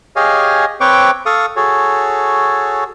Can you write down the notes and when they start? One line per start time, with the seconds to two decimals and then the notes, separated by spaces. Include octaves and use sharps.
0.16 G4 G#4 C#5 D#5 F5 G#5
0.81 C4 B4 C#5 G5 C#6 D6
1.26 A4 F5 C#6 D#6
1.56 F#4 G#4 A4 C#5